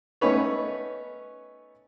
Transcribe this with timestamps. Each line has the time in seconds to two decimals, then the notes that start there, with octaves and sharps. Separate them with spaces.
0.21 A3 B3 C#4 D#4 B4 C#5